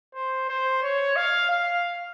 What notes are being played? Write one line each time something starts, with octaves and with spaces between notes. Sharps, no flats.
C5
C5
C#5
F5
F5